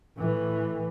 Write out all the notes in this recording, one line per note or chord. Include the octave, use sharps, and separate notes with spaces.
A2 E3